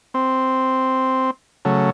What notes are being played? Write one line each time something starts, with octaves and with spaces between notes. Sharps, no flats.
C4
C#3 F#3 A3